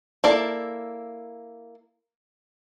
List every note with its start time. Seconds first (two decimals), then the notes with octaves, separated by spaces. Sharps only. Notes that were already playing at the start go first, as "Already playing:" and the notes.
0.24 A#3 E4 A4 D5